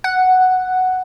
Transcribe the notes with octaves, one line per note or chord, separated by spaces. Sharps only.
F#5